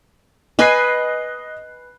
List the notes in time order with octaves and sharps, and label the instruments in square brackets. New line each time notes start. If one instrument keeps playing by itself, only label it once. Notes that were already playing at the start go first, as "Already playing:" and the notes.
[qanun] B4 G#5 [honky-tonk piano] D#5 F#6 C7